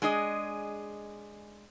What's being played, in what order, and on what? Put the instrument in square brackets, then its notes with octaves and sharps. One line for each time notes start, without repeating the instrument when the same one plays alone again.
[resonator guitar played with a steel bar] G#3 D4 G#4 D#5